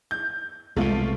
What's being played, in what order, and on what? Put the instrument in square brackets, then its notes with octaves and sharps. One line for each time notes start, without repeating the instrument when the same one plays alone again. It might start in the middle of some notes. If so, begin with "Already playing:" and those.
[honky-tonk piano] G6
[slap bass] C2 B2 [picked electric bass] G#3 [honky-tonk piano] A3 F4